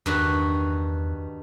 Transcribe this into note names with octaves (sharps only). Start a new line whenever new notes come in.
E2 G2 D#3 F#4